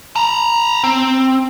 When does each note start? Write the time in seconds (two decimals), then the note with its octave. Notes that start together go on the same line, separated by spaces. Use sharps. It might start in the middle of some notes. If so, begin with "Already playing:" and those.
0.16 A5 A#5
0.84 C4